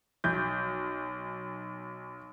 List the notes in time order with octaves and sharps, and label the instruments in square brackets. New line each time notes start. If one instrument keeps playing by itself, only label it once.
[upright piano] B1 G6